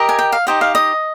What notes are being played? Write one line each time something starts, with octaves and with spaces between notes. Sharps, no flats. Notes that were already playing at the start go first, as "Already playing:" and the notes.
Already playing: G4 A#4 D#5
G#5
G5
F5
D#4 G4 C5 D#5 G5
F5
D#5